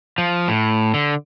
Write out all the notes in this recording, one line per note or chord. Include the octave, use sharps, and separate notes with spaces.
F3
A2
D3